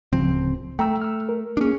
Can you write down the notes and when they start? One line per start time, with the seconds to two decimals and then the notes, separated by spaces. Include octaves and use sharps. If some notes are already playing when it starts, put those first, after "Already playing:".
0.13 D1 C#3 F3 C4
0.79 A3 G5 A#5 E6
1.02 E6 F6
1.29 A#4
1.57 A#3 C#4 D4 G#4